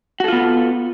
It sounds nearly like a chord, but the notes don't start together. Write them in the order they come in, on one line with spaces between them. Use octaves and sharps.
F#4 A4 F4 B3